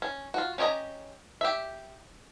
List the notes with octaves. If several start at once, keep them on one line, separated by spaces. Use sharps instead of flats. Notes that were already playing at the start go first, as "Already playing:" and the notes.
C#4
F4 F#4
C#4 G4 C#5 D#5 A#5
G4 E5